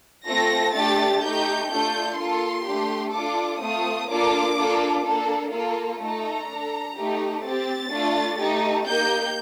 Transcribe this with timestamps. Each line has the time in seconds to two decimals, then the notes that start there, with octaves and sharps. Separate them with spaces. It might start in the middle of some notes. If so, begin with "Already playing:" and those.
0.27 A3 C4 F4 A4 A#6
0.74 A3 D4 G4 A6
1.22 A3 D#4 G4 G6
1.70 A3 D4 F4 A4 G6
2.18 A#3 F4 A4 C6
2.66 A3 D4 G4
3.13 D4 F4 A4 D6
3.61 A3 C4 F4 D#6
4.09 A#3 D4 F4 A4 D6
4.57 A#3 D4 F4 A4
5.05 A#3 D4 A4
5.52 A#3 F4 A4
6.00 A3 D#4 A4 A#5
6.48 D4 A4
6.96 A3 D#4 G4
7.43 C4 G4 A6
7.91 A3 D4 F4
8.39 A3 D#4 G4
8.87 A#3 D#4 G4 G6